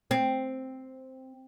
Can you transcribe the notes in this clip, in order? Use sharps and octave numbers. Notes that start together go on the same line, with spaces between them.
C4